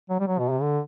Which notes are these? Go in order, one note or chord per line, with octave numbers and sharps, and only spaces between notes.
F#3
G3
F#3
B2
C3
D3